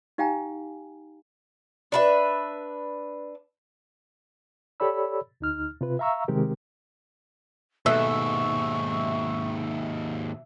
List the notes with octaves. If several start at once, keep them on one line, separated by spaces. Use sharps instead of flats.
D#4 G4 F5 G5 G#5 A#5
D4 B4 E5
G4 A4 C#5 D5 B5 E6
D2 D#4 F6
C3 F4 B4
E5 F5 A#5 C#6 E6
C3 D#3 G#3 C4 G4 A#4
D#2 G#2 B2 A3 E5 C#6